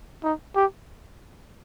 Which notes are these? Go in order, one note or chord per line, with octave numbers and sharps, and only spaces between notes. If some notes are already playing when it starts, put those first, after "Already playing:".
D#4
G4